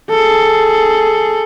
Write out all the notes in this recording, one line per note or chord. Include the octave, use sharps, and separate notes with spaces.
G#4 A4